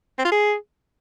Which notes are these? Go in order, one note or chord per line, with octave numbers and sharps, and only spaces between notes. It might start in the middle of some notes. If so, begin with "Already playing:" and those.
C4
F4
G#4